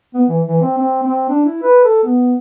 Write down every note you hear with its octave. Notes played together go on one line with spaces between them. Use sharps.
B3
E3
E3
C4
C4
C4
D4
E4
B4
A4
B3